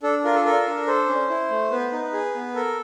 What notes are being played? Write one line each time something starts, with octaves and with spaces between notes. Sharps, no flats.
D4 A4
F4 A#4
A4
A4 A#4
D4
A4 C5
C#4
E4
A3
B3 B4
D#4
G#4
B3
A4 A#4